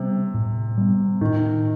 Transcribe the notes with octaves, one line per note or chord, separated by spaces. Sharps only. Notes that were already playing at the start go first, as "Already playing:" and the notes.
Already playing: C3 G3 B3
A2
G3 B3
A2 D#3